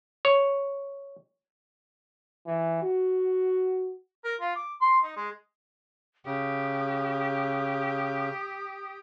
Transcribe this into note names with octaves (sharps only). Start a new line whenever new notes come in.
C#5
E3
F#4
A#4
F4
D6
C6
D#4
G#3
C#3 G4 D#6